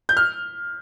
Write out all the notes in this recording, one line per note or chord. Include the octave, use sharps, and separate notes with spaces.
G6
F6